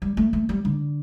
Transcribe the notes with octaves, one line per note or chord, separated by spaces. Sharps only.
G3
A3
A3
G3
D3